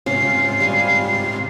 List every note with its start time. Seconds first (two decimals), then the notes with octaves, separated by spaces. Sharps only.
0.06 G#2 C3 C#4 F4 F5 C7
0.60 G3 F5 G#5